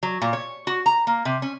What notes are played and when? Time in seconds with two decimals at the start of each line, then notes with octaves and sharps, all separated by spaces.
0.03 F#3
0.22 A#2
0.33 C#5
0.67 F#4
0.86 A#5
1.07 A#3
1.25 C3
1.42 C#4